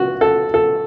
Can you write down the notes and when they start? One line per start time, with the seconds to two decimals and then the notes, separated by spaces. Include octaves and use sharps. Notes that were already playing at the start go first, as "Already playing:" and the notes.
Already playing: F#4
0.21 A4
0.54 A4